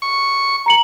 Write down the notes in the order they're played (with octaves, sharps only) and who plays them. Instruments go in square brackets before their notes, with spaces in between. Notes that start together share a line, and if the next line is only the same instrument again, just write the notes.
[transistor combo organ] C#6
[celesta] A#5 C#7 F#7